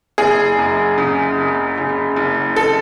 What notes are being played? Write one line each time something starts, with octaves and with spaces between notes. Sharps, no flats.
F#1 G#4
F#2
C#3
F#1
C#3
F#1
A4